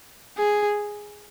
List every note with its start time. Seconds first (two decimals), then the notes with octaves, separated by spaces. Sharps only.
0.38 G#4